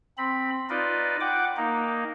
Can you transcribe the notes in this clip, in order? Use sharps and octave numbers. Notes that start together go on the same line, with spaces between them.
C4 B5
D#4 F4 B4 D5 D#5
F#5 G5 D6
A#3 D#4